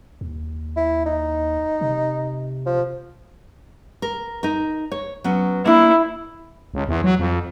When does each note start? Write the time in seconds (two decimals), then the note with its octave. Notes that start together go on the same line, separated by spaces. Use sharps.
0.21 D#2
0.77 E4
1.06 D#4
1.81 C3
2.66 F3
4.02 A#4
4.43 D#4 A#4
4.92 C#5
5.24 F#3 B3 C#4
5.66 A#3 D4 E4
6.74 C#2
6.88 E2
7.04 F#3
7.19 F2